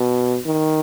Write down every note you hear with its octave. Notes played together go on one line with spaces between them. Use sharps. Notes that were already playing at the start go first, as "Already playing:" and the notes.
Already playing: B2
D#3